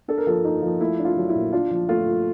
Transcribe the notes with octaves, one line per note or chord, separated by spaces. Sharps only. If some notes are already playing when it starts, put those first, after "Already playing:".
D4 A4
A#4
F3 A4
A#3 D#4
F3
A3 E4
D4
F4
F#3
E4
A#2
D4 F4
F3
A3 F4
F3